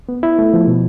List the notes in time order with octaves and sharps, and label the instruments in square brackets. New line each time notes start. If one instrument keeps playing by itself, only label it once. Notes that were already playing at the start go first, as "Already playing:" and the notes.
[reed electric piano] B3
E4
A3
F3
B2